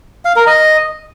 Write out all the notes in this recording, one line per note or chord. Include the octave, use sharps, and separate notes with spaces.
F5
A#4
D#5